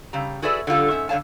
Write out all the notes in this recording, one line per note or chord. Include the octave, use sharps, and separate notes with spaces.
C#3 G3 A#5
F#4 G#4 A4 B4 D5 E5
D3 G3 F4 A4
G#2 C#4 E5
D3 G3 C#5 F5 A5